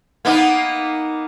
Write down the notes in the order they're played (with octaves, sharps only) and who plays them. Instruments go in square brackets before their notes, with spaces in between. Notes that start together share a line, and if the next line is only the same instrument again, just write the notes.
[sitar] A#3 B3 D#4